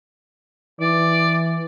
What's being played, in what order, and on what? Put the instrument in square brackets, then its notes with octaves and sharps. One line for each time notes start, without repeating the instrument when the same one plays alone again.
[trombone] E3 [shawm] D5